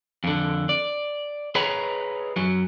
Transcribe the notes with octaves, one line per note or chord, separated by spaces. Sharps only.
F2 D3
D5
G#4 B4 C#5 D#5 A#5 B5
F#2 F#3